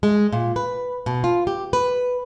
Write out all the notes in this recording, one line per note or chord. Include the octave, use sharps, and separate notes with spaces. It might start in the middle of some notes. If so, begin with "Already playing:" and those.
G#3
A#2
B4
B2
F4
G4
B4